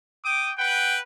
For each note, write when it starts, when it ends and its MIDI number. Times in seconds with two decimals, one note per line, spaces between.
0.24 0.50 79
0.24 0.50 86
0.24 0.50 87
0.57 0.98 71
0.57 0.98 78
0.57 0.98 79